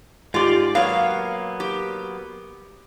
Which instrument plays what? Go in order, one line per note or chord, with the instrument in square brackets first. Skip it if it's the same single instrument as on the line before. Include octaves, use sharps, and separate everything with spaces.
[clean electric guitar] G#2 D5 [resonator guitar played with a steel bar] F4 G4
[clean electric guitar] F#3 A#3 B3 [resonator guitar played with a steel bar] C#5 F5
[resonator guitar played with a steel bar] G4